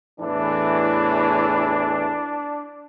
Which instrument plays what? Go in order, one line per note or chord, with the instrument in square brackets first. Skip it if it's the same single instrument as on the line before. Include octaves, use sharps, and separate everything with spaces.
[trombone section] E2 A2 E3 [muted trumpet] D4